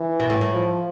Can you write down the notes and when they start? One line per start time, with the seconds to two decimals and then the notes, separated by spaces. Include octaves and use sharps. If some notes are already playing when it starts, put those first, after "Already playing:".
Already playing: E3
0.20 B2
0.30 A2
0.41 A2
0.52 F3